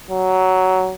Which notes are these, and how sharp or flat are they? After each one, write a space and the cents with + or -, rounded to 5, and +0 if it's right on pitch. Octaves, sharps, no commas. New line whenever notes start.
F#3 +15